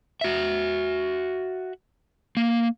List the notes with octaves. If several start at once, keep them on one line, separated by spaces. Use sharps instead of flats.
F#4 E5
A#3